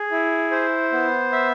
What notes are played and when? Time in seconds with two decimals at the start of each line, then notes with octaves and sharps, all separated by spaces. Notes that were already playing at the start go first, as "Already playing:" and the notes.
Already playing: G#4
0.11 E4
0.51 C5
0.93 B3
1.32 E5